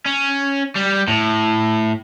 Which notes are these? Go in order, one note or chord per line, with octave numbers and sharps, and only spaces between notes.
C#4
G3
A2